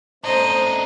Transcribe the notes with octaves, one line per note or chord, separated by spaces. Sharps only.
A3 C4 D4 D#4 C5 D#5